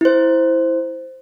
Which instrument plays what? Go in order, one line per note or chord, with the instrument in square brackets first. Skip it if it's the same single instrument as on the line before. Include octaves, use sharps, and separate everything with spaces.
[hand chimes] E4 C5